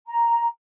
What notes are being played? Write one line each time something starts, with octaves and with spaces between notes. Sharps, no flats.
A#5